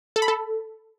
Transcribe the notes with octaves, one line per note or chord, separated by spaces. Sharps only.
A4
B5
A4